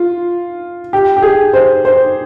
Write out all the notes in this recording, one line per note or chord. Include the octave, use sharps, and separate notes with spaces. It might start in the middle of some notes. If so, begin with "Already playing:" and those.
Already playing: F4
G4
G4
G#4
C5
C5